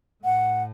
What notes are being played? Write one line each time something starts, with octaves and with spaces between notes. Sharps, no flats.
A2 F#5